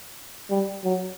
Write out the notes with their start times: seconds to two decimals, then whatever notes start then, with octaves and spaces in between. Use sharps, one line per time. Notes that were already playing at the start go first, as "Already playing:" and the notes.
0.50 G3
0.84 F#3